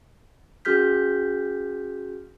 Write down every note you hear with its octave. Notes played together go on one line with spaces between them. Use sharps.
C#4 F#4 G#4 F6 G6 B6